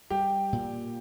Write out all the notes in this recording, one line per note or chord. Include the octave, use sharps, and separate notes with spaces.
G3 G4
A#2